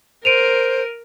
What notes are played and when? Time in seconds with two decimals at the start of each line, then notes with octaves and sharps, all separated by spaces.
0.25 A#4 C5 D7 D#7 F7